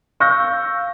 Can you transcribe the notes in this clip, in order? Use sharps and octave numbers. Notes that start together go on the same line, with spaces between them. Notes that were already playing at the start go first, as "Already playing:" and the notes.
F5 C#6 E6 G6 A#6